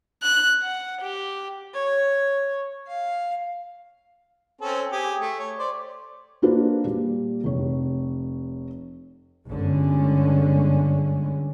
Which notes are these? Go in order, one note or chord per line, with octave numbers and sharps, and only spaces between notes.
F#6
F#5
G4
C#5
F5
C4 C#4 A4
G4 G#4
A3
C#5
C5 D5
A#3 D4 F#4 B4 C5
A#2 G3
F1 C#5
G1 D3 G#3 C#4